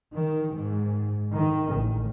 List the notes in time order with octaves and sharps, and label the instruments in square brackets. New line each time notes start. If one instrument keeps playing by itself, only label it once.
[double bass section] D#3
G#2
D#3
A1